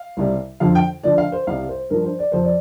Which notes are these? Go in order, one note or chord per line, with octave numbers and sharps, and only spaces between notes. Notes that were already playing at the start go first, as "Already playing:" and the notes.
Already playing: F5
C2 C3 G3
F2 D3 F3 F5
G5
D2 D3 F3 D5
F5
C5
C2 C3 G3 F5
C5
G2 F3 A#4
C5
D5
F2 F3 C5
D5